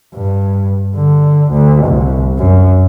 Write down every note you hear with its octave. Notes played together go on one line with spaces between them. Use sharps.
G2
D3
D2
C2
F#2